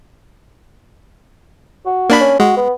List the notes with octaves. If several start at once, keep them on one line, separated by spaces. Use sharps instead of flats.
F#4
A#3 D4 B5
C#4
G#3 F#4
B3